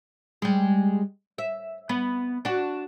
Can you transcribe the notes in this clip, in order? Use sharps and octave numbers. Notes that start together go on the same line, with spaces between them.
G3 G#3
E5
B3
D4 F#4